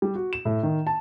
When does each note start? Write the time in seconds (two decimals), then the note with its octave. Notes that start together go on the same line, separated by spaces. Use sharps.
0.02 G3
0.15 F#4
0.33 E7
0.45 A2
0.63 D#3
0.87 A5